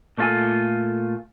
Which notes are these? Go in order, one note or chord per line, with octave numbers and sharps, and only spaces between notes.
A#2 A3 C#4 F4 A4 G#5